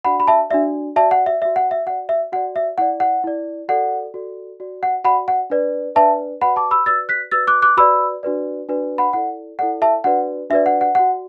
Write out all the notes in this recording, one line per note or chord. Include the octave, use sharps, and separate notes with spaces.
D4 F#4 D5 F#5 B5
B5
E5 A5
D4 F#4 D5 E5
F#4 D5 E5 A5
F#5
E5
F#4 D5 E5
F#5
E5
F#4 D5 F#5
E5
F#4 D5 F#5
E5
E4 D5 F#5
F#5
E4 D5
F#4 A4 D5 F#5
F#4 A4 D5
F#4 D5
F#5
F#4 D5 F#5 B5
F#5
D4 B4 D5
D4 B4 D5 E5 A5
F#4 B4 D5 F#5 B5
A5 D6
B5 E6
F#4 B4 D5 E6 A6
F#6 B6
F#4 B4 D5 E6 A6
D6 F#6
D6 F#6
F#4 B4 D5 B5 E6
D4 F#4 B4 D5
D4 F#4 B4 D5
F#5 B5
E4 A4 D5 F#5
E4 A4 D5 F#5
E5 A5
D4 F#4 B4 D5 F#5
D4 F#4 B4 D5 E5
F#5
F#5
F#4 D5 F#5